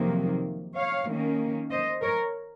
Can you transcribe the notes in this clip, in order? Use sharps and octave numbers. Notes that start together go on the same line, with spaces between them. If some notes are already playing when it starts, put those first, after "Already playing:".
Already playing: F2 C3 D#3 F#3 A#3
C#5 F5
D#3 A#3 C#4
C5 D#5
A#4 C#5